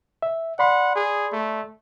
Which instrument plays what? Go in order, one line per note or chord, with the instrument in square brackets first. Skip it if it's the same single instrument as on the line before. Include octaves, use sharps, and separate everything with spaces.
[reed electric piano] E5
[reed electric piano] D5 B5 C6 [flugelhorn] F#5
[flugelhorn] G#4
A3